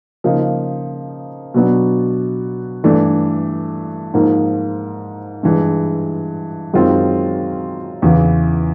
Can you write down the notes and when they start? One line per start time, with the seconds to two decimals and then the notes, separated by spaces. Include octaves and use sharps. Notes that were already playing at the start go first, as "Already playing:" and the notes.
0.24 C#3 F3 A#3 D#4
1.54 B2 F#3 B3 D4
2.84 G2 E3 A3 D4
4.14 G#2 F3 A#3
5.43 G2 E3 G#3
6.74 F#2 D#3 G#3 C4 F4
8.02 E2 C#3 E3